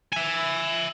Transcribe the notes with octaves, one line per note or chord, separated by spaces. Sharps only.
E5 G#5